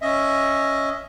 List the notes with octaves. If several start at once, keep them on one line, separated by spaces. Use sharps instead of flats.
C#4 D#5 E5